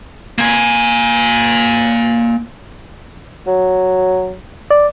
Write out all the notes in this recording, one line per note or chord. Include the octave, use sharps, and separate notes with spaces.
A#3 G#5
F#3
D5